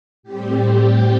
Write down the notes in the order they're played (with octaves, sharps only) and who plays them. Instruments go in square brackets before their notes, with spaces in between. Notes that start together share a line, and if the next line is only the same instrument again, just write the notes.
[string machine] A2 G3 C4 G4
G4